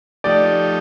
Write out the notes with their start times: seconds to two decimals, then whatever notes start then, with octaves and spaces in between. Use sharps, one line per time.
0.24 F3 A3 D#4 G4 D5